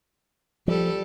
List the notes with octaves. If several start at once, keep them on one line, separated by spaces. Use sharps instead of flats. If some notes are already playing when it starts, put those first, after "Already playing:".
F3 G3 A4